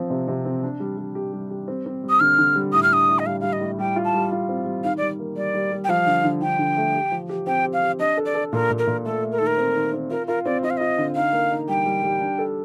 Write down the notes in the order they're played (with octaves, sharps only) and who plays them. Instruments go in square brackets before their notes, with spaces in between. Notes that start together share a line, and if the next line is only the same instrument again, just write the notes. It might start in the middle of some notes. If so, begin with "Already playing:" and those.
Already playing: [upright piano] F3 C4
C3
C3
C4
D4
G3
G3
G4
G3
G4
C4
C4
G3
[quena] D#6
[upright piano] D3 [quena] F6
[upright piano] D3
G3
[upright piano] A2 [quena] D#6
[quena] F6
[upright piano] D4 [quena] D#6
[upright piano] A2
[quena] D#5
[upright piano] G3 [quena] F5
[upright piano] G3 [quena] F5
[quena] D#5
[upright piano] A2
[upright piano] G3 [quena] G5
[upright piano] F4
[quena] A5
[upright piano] G3
F4
C4
G3
[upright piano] D#3 [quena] F5
[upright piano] G3 [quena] D5
[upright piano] A#3
[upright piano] G3 [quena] D5
[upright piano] G3
G3
[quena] G5
[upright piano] F3 [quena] F5
[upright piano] D3
D3
[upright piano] D3 [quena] G5
[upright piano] D3
A3
G4
F3
G4
[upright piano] C4 [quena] G5
[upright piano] G4
[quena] F5
[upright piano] G4
[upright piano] D4 [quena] D#5
[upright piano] A4
[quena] D5
[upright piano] A4
[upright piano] A#2 [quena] A#4
[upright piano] A#2
[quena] A#4
[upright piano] A#2
[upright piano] A3 [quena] A4
[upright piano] A3
[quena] A#4
[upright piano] D#3 [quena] A4
[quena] A#4
[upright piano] C4
D#3
C4
[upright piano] F4 [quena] A#4
[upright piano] F4 [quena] A#4
[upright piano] C4 [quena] D5
[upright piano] F4 [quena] D#5
[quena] F5
[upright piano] F4 [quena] D#5
[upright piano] D3
[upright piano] D#4 [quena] F5
[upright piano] A#3
D#4
[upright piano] G3 [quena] G5
[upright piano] G3
G3
D4
A4